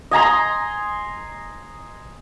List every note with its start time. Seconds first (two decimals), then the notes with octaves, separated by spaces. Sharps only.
0.11 D#5 G#5 A#5 C6